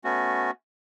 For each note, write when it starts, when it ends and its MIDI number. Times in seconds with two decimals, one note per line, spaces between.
0.04 0.51 57
0.04 0.51 59
0.04 0.51 61
0.04 0.51 66